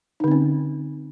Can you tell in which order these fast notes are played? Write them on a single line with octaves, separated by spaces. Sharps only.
D#4 D3 C4 C#4